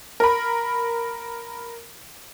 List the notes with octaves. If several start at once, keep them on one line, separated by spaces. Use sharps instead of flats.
A#4 B5